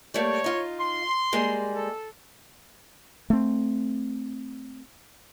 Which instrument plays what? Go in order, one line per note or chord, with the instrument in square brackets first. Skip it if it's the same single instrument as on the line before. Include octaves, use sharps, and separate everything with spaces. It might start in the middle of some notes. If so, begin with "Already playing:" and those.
[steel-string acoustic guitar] G3 A3 A#3 [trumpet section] C#5
[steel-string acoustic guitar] D#4 F4
[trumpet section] C6
[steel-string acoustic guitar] G3 G#3 A#3
[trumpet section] A4
[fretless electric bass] A3 C4